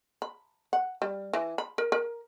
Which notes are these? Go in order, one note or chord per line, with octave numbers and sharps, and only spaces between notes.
B5
F#5
G3
E3
B5
A#4
A#4